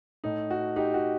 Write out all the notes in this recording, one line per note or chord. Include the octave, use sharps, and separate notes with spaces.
A2 A3 D#4
F#4
D#4 G4
F#4